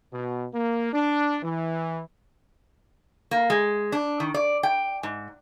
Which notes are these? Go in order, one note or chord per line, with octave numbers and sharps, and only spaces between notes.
B2
A#3
D4
E3
A#3
G#3
D4
D#3
D5
G5
G#2